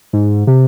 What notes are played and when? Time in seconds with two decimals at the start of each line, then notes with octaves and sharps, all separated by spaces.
0.13 G#2
0.47 C3